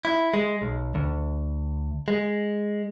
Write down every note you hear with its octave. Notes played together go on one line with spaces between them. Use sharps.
E4
G#3
B1
D2
G#3